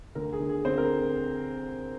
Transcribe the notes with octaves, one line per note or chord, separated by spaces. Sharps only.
D2 A#4
G#4
D3
G#4
D3 C4 C5
A#4